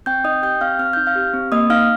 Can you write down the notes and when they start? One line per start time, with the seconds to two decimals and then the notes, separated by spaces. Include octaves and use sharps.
0.06 C4 G5 G6
0.24 D#4 D#5 D#6
0.42 G4 G5 G6
0.61 C4 F5 F6
0.79 C4 F6
0.93 D#4 G6
1.07 F5 F6
1.16 G4
1.34 C4
1.52 A#3 D#5 D#6
1.70 D#4 F5 F6